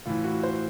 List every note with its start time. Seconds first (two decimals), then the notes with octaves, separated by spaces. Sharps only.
0.06 A2 E3 F4
0.24 F#4
0.43 C5